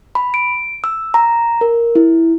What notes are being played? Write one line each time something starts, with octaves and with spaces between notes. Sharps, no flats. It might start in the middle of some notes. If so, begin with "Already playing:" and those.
B5
D7
E6
A#5
A#4
E4